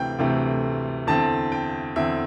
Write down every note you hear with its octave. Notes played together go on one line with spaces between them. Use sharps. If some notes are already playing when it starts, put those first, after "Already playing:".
Already playing: D2 C3 E3 A3 C4 G5
D2 C3 E3 A3 C4
E2 D3 C4 A5
G5
E2 D3 C4 E5